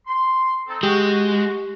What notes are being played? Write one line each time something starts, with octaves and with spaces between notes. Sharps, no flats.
C6
C4 D#4 A4
G#3 F#4 G4